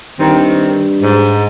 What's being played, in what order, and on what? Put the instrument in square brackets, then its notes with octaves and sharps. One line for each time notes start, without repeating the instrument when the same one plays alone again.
[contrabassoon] G2 [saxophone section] D#3 C4
[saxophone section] G#2